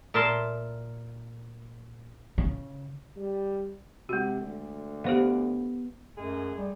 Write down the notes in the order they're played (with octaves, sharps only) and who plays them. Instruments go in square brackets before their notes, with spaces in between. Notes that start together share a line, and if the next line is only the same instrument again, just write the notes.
[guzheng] A#2 A#4 E5 A5 C6
[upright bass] C#3
[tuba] G3
[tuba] C3 [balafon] G#3 F#4
[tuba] D2
[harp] B3 D7 [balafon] G4 C5 F5
[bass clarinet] F#2 [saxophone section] G#3 A3 G#4
[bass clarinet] G3